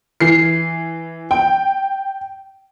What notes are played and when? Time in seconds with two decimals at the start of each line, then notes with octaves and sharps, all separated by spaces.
0.21 E3 C7
1.31 G5